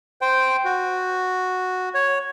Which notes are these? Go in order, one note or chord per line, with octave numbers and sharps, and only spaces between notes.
C5 G5
F#4
C#5